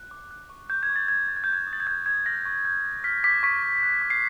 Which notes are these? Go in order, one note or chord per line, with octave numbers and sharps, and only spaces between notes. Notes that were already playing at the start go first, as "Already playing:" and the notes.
Already playing: F#6
D6
F#6
C#6
C#6 G6
G#6
C#6
A6
G6 G#6
D6 A6
G#6
G6
F#6
G#6
D#6
A6
G#6
F#6 G6
G6
D#6 G#6
F6 A#6
C#6
G6
D6
F6 B6
D6 B6
C#6 B6
C#6
F#6
D6
C7